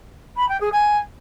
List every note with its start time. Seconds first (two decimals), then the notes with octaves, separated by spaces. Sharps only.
0.37 B5
0.49 G5
0.60 G#4
0.72 G#5